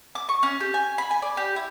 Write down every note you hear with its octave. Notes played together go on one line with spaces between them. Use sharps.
D6
C#6
C#4
G4
G#5
B5
G#5
D5
G4
E4